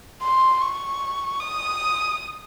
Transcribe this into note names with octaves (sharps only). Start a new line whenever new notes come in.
C6
C#6
D#6